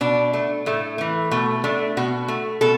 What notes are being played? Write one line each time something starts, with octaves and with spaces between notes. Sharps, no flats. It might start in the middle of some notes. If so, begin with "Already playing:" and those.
B2 D4
A3
A2 A3
E3 A3
B2 A3
A3 D4
B2 F#4
A3
B2 A4